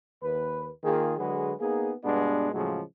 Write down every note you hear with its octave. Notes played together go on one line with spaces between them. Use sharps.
D#2 B4
D#3 A#3 F4 G#4
D3 F#3 G#3 F#4 G#4 B4
A#3 B3 D#4 G#4
G2 B2 G#3 B3 D4
A2 C#3 F3 F#3 G#3